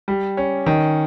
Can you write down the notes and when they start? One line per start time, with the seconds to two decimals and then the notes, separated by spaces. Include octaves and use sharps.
0.08 G3
0.37 C#4
0.66 D#3